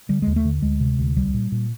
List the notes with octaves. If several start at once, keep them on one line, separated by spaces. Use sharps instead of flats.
D3 G3
D#2 G#3
A3
D3
D2 G#3
C3
D2
C2 G3
A#2
A#2